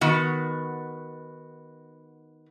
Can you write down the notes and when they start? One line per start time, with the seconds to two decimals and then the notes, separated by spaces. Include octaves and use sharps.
0.01 D#3 B3 F#4